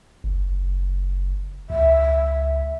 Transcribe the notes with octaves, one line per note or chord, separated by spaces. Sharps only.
F#1
C#2 E5